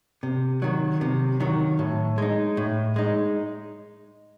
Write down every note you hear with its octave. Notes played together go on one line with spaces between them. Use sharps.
C3
D#3 F#3
C3
D#3 F#3
A2
G#3 D#4
A2
G#3 D#4